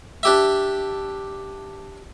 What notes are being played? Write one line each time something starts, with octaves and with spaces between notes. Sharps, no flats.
D4 G4 E5